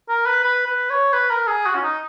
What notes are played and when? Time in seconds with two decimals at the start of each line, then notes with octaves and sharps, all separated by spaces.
0.09 A#4
0.27 B4
0.44 B4
0.66 B4
0.90 C#5
1.13 B4
1.31 A#4
1.47 G#4
1.66 F#4
1.75 C#4
1.82 D#4